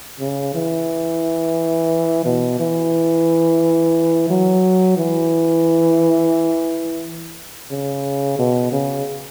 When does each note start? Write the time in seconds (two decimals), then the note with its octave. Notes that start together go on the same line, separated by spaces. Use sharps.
0.20 C#3
0.55 E3
2.25 B2
2.59 E3
4.30 F#3
4.97 E3
7.71 C#3
8.39 B2
8.72 C#3